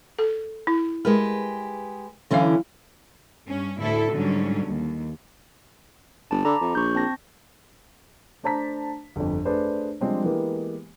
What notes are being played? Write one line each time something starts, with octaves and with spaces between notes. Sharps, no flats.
A4
E4
G#3 G4 A#4 B4
D3 E3 F#3 C#4 F5
G2 C#4
D2 A2 A3 E4 A4
G#2 D3 F#3 G3 C#4
D#2
G1 A5
D3 A#5 B5 D6
F2
A#1 C#6 G6
C4 A5 A#6
A3 D4 C5 A5 A#5 B6
G1 F2
A3 D4 G#4 B4 C5 D5
F3 G3 G#3 C4 D4
E3 G#3 A#3 B3 G4